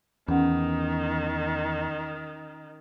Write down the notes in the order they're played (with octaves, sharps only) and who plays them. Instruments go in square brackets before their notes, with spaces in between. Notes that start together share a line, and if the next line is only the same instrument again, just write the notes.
[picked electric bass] E2 [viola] D#3 [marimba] C#4 F#5